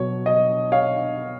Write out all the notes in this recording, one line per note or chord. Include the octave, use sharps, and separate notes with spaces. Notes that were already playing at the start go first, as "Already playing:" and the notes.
Already playing: B2 F#3 C#5
D#5
C#5 F5